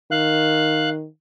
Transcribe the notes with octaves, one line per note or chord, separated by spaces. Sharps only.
D#3 F5 F#6